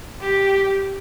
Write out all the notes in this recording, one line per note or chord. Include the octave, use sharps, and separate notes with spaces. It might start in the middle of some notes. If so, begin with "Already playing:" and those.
G4